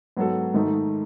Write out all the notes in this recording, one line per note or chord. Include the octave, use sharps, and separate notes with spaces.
G#2 F#3 B3 F#4 A4
G#2 D#3 A3 D#4